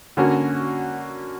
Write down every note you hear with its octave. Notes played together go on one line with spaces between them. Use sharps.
D3 A#3 C#4 F#4